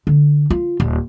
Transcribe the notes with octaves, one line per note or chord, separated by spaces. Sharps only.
D3
F4
D#1